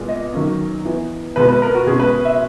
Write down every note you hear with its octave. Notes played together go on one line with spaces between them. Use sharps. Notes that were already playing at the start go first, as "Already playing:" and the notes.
Already playing: A#2 G#3 B3
D#5
D#3 F#3 A#3 C#4
E3 B3
B2 G#3 B3 B4
B4
A#4
F#4
B2 G#3 C#4 G#4
B4
E5